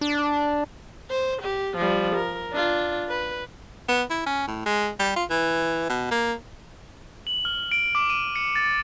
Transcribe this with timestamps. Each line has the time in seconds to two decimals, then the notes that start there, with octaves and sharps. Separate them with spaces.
0.01 D4
1.10 C5
1.42 G4
1.77 F3 G3
2.15 A#4
2.52 D4 F4
3.09 B4
3.89 B3
4.10 E4
4.26 C#4
4.48 A2
4.66 G#3
5.00 G3
5.16 F4
5.30 E3
5.90 B2
6.11 A#3
7.27 F#7
7.45 F6
7.72 D7
7.95 D6
8.10 D#7
8.36 C#7
8.55 A6